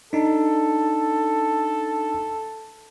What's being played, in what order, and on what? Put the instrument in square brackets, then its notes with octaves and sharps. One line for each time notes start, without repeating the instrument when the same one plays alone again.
[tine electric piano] D4 D#4 [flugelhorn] A4